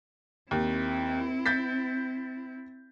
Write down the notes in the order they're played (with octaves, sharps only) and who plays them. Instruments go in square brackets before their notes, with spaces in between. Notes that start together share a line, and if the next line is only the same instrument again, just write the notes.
[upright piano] D#2 [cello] C4 E4
[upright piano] G6 A6 B6